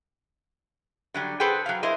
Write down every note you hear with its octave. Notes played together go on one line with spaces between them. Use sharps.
D3 F#3 G3
G#4 A4 B4 C5 F#5 G5
F#3 F5
E4 A#4 C5 D#5